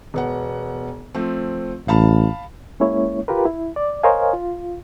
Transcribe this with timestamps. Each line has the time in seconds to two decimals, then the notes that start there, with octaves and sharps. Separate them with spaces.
0.14 E1 B3 F#5
1.14 F3 A3 C4
1.88 A1 F5 A5 B5
2.80 G#3 A#3 C#4 E4 C#5
3.28 F4 G4 A#4 B4
3.46 E4
3.76 D5
4.03 A#4 C5 C#5 D#5 F5 G#5
4.33 F4